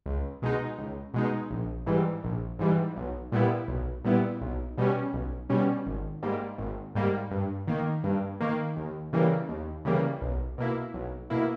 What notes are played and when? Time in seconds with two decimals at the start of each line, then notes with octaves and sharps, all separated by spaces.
0.06 C#2
0.42 B2 G#3 D#4
0.78 C#2
1.14 B2 G#3 D#4
1.51 A#1
1.86 G#2 E3 G3
2.23 A#1
2.59 G#2 E3 G3
2.96 B1
3.32 A#2 G3 B3 E4
3.68 B1
4.04 A#2 G3 B3 E4
4.41 B1
4.78 B2 G3 C#4
5.13 B1
5.50 B2 G3 C#4
5.86 G#1
6.23 G#2 G3 A#3
6.58 G#1
6.95 G#2 G3 A#3
7.31 G2
7.67 D#3 A#3
8.04 G2
8.41 D#3 A#3
8.77 D#2
9.13 C#3 E3 G3 A#3
9.49 D#2
9.85 C#3 E3 G3 A#3
10.22 B1
10.58 B2 A#3 E4
10.94 B1
11.30 B2 A#3 E4